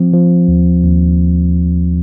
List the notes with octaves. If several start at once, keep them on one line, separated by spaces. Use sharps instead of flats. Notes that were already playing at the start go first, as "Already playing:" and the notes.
Already playing: F3 C4
F3
D#2
D#2